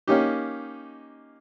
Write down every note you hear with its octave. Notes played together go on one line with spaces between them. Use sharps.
A#3 C#4 D#4 G4